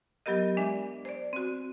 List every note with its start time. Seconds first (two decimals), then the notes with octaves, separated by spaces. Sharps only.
0.26 F#3 B3 G4 A#4 D#5
0.57 G#3 D4 D5 E5
1.05 C5 D5
1.33 C4 F#4